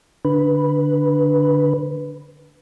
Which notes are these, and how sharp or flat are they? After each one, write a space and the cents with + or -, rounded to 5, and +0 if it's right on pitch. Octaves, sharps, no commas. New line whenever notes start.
D3 +0 B4 +0